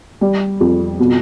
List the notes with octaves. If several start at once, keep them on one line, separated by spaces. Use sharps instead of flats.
G3
F2
B2